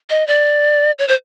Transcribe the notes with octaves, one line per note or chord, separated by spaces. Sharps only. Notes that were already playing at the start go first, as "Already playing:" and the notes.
D#5
D5
C#5
C5